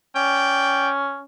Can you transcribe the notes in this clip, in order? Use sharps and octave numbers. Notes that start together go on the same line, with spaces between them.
C#4 D5 G5